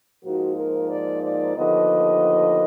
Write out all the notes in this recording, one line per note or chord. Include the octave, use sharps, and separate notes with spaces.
G#2 F3 A#3 D#4 F#4
A#4
D5
D5
D#2 D3 F3 B3 D#5